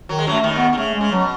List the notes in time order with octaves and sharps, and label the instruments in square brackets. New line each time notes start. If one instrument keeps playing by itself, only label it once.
[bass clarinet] D#3 [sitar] F#3
[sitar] G#3
[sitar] F#2 F#3 [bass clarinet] A3
[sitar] D#2 D#3
[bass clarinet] B3
[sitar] D#3
[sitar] C#3 [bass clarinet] A3
[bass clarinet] G#3
[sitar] C#3
[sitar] B2 [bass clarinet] F#3